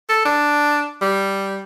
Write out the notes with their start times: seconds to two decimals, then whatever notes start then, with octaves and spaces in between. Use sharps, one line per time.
0.09 A4
0.25 D4
1.01 G3